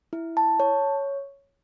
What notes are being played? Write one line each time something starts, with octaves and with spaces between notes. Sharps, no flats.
E4
A5
C#5